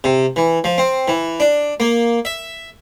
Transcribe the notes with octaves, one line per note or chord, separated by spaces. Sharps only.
C3
E3
F3
C4
E3
D4
A#3
E5